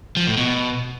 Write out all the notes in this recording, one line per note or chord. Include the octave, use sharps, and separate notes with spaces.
F3
A2
B2